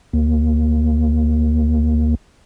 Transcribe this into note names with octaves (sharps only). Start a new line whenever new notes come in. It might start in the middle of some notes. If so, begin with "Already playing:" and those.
D2 A#3